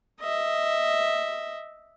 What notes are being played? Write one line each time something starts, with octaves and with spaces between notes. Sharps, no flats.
D#5 E5